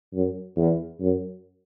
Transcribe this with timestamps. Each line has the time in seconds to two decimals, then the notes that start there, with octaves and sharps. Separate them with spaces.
0.14 F#2
0.57 E2
1.00 F#2